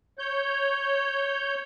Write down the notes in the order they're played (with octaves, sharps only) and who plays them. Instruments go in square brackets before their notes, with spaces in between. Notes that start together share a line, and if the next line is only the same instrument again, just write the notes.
[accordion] C#5 G6